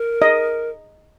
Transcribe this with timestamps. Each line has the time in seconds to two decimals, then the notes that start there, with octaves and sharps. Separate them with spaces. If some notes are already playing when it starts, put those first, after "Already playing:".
Already playing: A#4
0.22 D#5